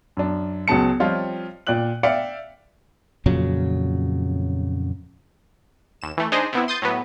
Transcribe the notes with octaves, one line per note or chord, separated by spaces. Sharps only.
F#2 D4
C#2 F#3 B3 A5 C#7
F3 G3 C4 F4 C#5 D#5
A#2 D5 G5 F#6 F#7
D5 E5 F5 G5 C#7
F2 A#2 C#3 F#3
D#2 E7
E3 A3
D4 D#4 G#4 C5 D#5
C3 B3 E4
C6 D#6 G6 A6
A2 F#3 B3